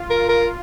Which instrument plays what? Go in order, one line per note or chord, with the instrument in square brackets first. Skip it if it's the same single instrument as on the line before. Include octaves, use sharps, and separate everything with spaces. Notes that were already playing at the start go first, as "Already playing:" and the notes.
Already playing: [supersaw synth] F4
[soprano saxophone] A#4
A#4